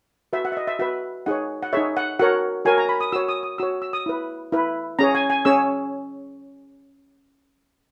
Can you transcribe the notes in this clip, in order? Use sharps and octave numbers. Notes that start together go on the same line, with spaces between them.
F#4 B4 E5
F#5
E5
D#5
E5
F#4 B4 E5
D#4 G#4 C#5 F#5
F#5
D#4 G#4 C#5 E5
F#5
F#4 A#4 C#5 F#5
F#4 A#4 C#5 G#5
A#5
B5
D#6
F#4 C#5 E6
D#6
D#6
F#4 C#5 E6
E6
D#6
E4 B4
E4 B4
C#4 G#4 C#5 A#5
G#5
G#5
C#4 G#4 C#5 E6